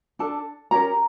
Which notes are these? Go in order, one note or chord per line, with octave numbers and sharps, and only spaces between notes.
D4 A4 A5
C#4 G4 A#4 A#5